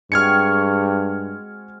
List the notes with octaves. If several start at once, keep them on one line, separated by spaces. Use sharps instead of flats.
G2 G#3 C4 F#4 F6 G#6 C#7